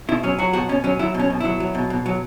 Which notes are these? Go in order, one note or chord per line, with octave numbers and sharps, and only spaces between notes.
B2 E4
F#3 C#4
F#3 F#4
B2 F#4
B2 C#4
F#3 C#4
F#3 E4
B2 C#4
B2
F#3 E4
F#3
B2
B2
F#3